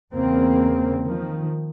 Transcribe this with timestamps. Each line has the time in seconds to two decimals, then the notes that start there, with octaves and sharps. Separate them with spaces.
0.13 E2 C#3 A#3 C4
1.04 D#3 F3